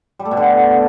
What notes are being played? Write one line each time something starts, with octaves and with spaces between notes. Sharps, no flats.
G3
A3
B2
D3
B3